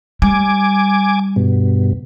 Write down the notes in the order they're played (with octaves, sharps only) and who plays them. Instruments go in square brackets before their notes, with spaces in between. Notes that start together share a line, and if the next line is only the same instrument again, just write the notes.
[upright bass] G3 [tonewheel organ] G#5 D6
[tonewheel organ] G2 B2